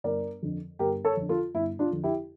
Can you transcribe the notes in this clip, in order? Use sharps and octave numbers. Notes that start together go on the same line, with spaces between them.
G1 A#4 D5
F2 D3
G1 G4 A#4
A4 C#5
F2 D3
F4 A4
G1 E4
D4 F4
F2 D3
E4 G4